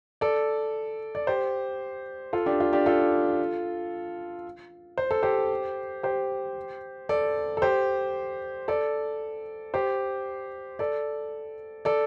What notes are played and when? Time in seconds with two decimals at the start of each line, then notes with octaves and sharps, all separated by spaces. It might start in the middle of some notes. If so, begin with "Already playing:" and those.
0.21 A4 D5
1.15 D5
1.27 G4 C5
2.33 F4 A4
2.46 D4 G4
2.60 F4
2.73 D4 G4
2.86 F4 A4
4.98 C5
5.11 A4
5.23 G4 C5
6.03 G4 C5
7.09 A4 D5
7.57 A4
7.62 G4 C5
8.68 A4 D5
9.74 G4 C5
10.79 A4 D5
11.85 A4 D5